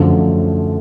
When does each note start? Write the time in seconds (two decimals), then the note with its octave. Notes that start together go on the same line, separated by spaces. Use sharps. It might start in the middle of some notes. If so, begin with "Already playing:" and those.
Already playing: F#2 D3 F3 A3